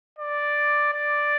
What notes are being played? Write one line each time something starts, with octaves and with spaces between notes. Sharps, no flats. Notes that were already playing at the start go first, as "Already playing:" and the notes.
D5
D5